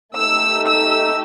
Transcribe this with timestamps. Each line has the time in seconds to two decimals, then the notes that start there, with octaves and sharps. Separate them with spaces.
0.15 A3 D#4 G4 E6
0.65 E6